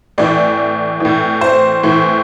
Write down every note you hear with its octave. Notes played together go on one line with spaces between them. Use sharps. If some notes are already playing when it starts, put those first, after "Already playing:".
A2 E3 D5
A2 E3
C5
A2 E3